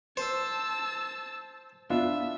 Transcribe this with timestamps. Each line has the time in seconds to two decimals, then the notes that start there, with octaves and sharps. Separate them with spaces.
0.17 C5 A5 E6
1.90 B3 D4 F4 E5